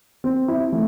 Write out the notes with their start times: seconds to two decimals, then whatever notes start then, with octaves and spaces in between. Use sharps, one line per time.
0.24 C4
0.48 E4
0.72 A3